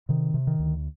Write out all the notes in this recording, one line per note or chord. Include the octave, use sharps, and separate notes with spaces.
C3 D#3
C3
D#3
D2